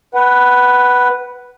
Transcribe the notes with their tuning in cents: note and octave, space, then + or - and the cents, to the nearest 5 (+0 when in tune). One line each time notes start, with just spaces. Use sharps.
B4 +0 F#5 +20